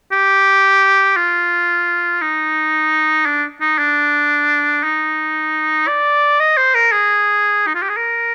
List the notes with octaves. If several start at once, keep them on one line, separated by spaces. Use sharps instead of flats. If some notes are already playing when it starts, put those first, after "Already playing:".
G4
F4
D#4
D4
D#4
D4
D#4
D5
D#5
C5
A#4
G#4
D#4
F4
G4
G#4
A#4